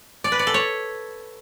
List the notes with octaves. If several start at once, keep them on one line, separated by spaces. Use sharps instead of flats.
D5
B4
D5
A4
C#5